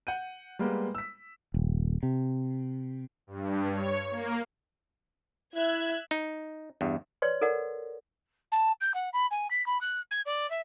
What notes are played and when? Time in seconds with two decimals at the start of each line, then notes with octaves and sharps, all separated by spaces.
0.07 F#5 G6 D#7
0.59 G3 G#3 A#3 B3
0.95 E6 B6
1.54 D#1
2.03 C3
3.27 G2
3.71 C#5
4.11 A#3
5.55 E4 E5 F#6 G#6
6.11 D#4
6.81 E2 G2
7.22 B4 C#5 D5 C6
7.41 A4 A#4 D5 F#5
8.52 A5
8.81 G6
8.94 F#5
9.13 B5
9.31 G#5
9.50 B6
9.66 B5
9.81 F#6
10.11 G#6
10.26 D5
10.50 E5